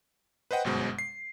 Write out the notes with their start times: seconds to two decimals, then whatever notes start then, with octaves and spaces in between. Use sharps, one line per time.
0.51 B4 C5 D#5 F#5 G5
0.64 G1 F#2 B2 G#3 C5
0.99 C7